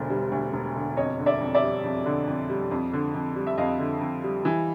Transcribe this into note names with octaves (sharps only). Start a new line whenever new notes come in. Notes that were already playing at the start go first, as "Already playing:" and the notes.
Already playing: E1 D2 D3 C5
G3
D2
E1
D3
F2 C#5 D#5
D3
D5 E5
F2
D5 E5
G3
F2
D3
F2
G3
F2
D3
F2
G3
E5
F2 D#5 F5
D3
F2
G3
E3